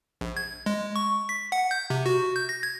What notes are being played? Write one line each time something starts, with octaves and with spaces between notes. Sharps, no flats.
A#1
G#6
G#3
C#6
B6
F#5
G6
C3
F#4
G6
A#6
G#6